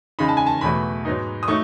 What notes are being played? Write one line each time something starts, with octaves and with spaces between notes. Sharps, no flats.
C#3 G#3 D#4 B5
A5
G#5
A5
E2 B2 F#3 A3 B5
G#2 F#3 B3 D#4
D#6
F#3 A3 D#4 C#6